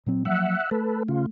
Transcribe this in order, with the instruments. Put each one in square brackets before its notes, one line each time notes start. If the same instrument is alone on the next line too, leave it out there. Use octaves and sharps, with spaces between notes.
[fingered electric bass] A#2 F#3 C4
[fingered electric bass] F3 F#3 A#3 [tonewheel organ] E5 F#5
[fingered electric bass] A3 [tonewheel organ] A4 B4
[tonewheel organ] C#3 F4